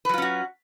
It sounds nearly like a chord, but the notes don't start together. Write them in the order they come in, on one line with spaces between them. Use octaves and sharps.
B4 F#3 F4 C#4 F#4